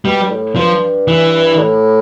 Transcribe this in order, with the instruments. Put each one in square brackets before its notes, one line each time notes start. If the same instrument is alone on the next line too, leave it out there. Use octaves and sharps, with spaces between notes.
[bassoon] B2 [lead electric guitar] G3
[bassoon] G2
A2
[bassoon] G2 [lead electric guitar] F3
[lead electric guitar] E3
[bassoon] A2